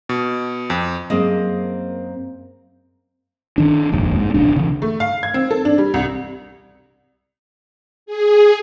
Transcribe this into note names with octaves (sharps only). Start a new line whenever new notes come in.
B2
F2
F#2 A#3 C4 G#4 C5 D#5
D#3 D4
F1 A#1 D#2 G#2
G#2
D1 A#1 C3 D4
C#3 E3
A3
F5
G#6
C4
A4
D4
G3
C2
G#4